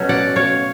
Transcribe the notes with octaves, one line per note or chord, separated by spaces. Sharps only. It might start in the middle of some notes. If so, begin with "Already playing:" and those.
Already playing: B2 F#3 A3 C#4
D5 F#5
C#5 F5